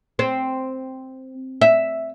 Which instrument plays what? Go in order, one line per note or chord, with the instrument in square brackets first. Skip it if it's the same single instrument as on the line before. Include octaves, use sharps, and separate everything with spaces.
[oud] C4
E5